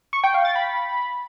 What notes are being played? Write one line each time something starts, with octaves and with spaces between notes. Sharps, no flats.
C#6
G5
F5
A6
B5